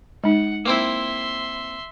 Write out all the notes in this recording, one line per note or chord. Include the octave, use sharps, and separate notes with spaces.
G#3 D#4 F#5
A#3 C4 E4 E5 C6